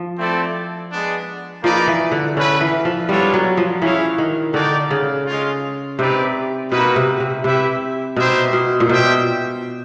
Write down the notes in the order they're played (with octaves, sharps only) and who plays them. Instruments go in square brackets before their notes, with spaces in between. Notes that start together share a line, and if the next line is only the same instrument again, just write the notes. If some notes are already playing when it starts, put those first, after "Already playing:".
Already playing: [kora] F3
[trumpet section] A3 C4 E4 A4 D5
G#3 B3 D4
[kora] F3 [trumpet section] A#3 D#4 G#4 B4 D5
[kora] E3
D3
[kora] D3 [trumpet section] C#4 F#4 B4 E5
[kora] E3
F3
[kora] G3 [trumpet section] B3 D4 F4 A4 C#5
[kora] F#3
F3
[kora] E3 [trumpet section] C#4 E4 G#4 C#5 F5
[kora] D#3
[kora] D3 [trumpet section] D#4 F#4 A#4 D5 G5
[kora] C#3
[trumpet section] G#3 C#4 F4
[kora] C3 [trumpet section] C4 D#4 G4 B4 D5
[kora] B2 [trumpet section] A#3 D#4 F#4 B4
[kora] C3
C3
[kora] C3 [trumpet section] E4 G4 B4 E5
[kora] B2 [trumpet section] B3 D#4 G4 C5 E5
[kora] B2
A#2
[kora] B2 [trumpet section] D4 G4 C5 E5 G5